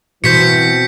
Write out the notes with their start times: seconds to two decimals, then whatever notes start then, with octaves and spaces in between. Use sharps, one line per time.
0.24 B2 E3 C4 G6 B6 C#7